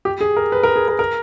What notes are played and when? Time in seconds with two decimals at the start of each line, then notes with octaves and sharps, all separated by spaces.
0.05 G4
0.21 G#4
0.36 A#4
0.52 B4
0.63 A#4
0.76 G#4
0.88 A#4
0.99 A#4